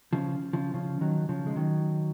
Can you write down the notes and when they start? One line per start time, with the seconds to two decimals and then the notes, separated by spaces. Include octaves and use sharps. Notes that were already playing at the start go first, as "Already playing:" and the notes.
0.13 C#3 F3
0.53 C#3 F3
0.74 C#3 F3
1.01 D#3 F#3
1.29 C#3 F3
1.47 G#3
1.56 D#3 F#3